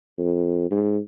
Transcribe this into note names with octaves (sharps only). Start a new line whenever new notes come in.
F2
G#2